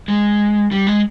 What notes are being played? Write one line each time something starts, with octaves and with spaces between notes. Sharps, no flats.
G#3
G3
G#3